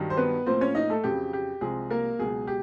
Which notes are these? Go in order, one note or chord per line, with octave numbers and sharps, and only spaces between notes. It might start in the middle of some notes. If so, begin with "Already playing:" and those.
Already playing: G2 D#3 F#3
C5
B3 B4
A2 F3 A#3 C4 C5
C#4 C#5
D#4 D#5
A3 A4
F2 C#3 F#3 G4
G4
C2 C3 F3 G#3 G#4
A#3 A#4
C#2 B2 F#3 G#4
G4